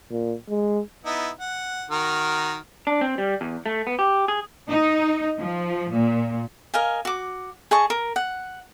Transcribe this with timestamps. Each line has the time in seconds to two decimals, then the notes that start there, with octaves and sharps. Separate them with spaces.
0.11 A#2
0.49 G#3
1.05 B3 D#4 E4
1.41 F#5
1.91 D#3 F#4 A#4
2.87 D4
3.01 C4
3.18 G3
3.41 E2
3.66 A3
3.87 B3
3.99 G4
4.28 G#4
4.69 D#4
5.40 F3
5.91 A#2
6.74 A#4 D#5 F5 G#5
7.05 F#4 D6
7.71 G#4 D#5 A5 C#6
7.90 A#4
8.16 F#5